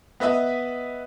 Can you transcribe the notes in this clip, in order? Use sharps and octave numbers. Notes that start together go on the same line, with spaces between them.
B3 B4 D#5 E5